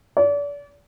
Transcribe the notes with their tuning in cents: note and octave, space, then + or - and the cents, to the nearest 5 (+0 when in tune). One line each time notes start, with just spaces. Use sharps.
D5 -35